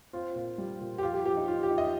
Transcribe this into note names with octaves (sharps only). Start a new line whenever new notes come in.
C4 F4
A#2
G3
A#2
G4
F3 F4
G4
F3 G4
D#4
D#4 F4
G4
D#4
D#5